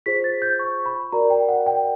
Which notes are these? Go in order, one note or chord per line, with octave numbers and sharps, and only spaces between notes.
F4 G#4 C5 B6
A6
G6
C#6
B5
F#4 A#4 D5 A#5
G5
F#5
G5